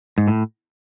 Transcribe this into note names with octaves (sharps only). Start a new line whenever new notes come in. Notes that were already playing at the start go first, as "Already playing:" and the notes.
G#2
A2